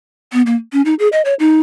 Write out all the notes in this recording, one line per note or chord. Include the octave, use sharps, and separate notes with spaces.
B3
A#3
C#4
D#4
G#4
D#5
C#5
D#4